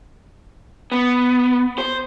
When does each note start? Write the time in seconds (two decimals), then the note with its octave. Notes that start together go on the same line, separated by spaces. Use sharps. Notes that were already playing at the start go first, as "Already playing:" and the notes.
0.92 B3
1.78 C5